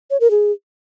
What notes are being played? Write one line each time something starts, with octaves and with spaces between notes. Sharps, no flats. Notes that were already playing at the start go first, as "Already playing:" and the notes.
C#5
A#4
G#4